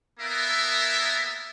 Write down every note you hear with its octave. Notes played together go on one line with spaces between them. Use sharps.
A#3 B3 E4 A4 A#4 E5